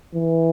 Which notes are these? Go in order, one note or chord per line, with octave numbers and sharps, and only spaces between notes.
E3